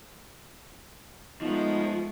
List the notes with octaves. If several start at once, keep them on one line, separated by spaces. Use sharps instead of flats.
F3 G#3 A3 B3 D#4